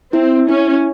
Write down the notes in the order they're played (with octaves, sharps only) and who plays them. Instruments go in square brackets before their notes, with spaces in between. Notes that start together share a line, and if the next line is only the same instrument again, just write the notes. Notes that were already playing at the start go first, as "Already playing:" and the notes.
[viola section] C4 [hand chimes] E4
[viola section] C#4 [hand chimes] E4